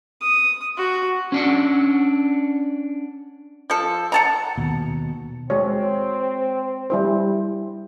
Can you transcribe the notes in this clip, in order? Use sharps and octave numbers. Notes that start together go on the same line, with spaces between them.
D#6
F#4
C#4 D4 F#5
F3 A4
F#5 A5 A#5
D#2 B2
G#3 C4 F#4 C#5
G3 E4 C5